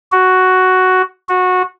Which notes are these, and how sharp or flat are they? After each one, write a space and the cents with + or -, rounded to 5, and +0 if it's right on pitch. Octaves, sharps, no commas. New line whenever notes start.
F#4 +5
F#4 -15